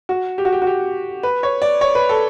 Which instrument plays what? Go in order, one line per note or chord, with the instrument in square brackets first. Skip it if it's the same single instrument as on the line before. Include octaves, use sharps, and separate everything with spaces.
[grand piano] F#4
G4
F#4
G4
F#4
G4
B4
C#5
D5
C#5
B4
A4